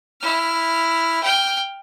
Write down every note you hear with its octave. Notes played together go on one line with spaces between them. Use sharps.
E4 F6
G5 F6